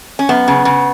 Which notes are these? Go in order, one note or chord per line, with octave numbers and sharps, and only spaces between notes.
C#4
F#2 B3
C#3
C#3